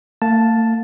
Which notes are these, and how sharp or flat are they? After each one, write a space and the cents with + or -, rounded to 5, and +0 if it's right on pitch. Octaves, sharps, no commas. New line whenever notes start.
A3 +45 F5 +20 A5 +0